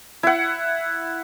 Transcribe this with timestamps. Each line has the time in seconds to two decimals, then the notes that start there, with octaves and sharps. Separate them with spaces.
0.23 E4 F#5